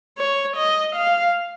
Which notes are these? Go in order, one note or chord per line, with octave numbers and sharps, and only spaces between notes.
C#5
D#5
F5